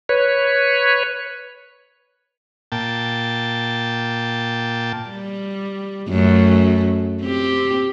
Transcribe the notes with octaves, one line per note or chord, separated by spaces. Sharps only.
B4 C#5
A#2 G5 A5
G3
F#2 A3
C4 G4